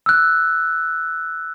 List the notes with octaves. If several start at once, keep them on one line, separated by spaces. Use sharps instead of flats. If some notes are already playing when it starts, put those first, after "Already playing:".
E6 F#6